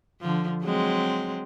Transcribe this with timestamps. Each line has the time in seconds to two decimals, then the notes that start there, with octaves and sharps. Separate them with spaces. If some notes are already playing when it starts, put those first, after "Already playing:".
0.21 D3 F3
0.64 F#3 G#3 C4